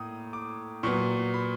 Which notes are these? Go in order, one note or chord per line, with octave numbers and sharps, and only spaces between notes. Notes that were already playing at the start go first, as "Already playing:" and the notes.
Already playing: A2 A#3 D#6
D6
A#2 F#3 B3 C#6
B5